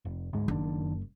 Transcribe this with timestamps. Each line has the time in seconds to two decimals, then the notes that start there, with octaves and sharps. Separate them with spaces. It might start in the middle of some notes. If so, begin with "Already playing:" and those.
0.05 F1
0.33 D2 G#2 G#3
0.48 F#1 F#2 D#3 D4